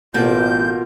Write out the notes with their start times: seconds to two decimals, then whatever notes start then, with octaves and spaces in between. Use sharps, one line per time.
0.14 A1 B2 A#3 F4 G6